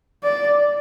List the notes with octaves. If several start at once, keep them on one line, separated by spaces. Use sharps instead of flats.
D5